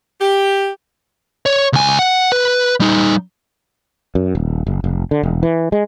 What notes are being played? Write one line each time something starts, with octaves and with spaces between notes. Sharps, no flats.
G4
C#5
C#2 G#5
F#5
B4
G3 D#4
F#2
D#1
F#1
F1
D3
E1
E3
G#3